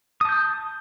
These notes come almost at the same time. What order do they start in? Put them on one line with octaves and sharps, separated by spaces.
D#6 A5 G6